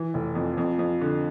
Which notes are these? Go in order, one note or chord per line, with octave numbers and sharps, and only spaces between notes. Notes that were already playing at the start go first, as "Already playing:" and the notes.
Already playing: E3
F1
F2
F2
F2
D3